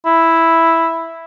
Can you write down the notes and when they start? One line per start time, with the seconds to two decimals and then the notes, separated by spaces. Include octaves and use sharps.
0.06 E4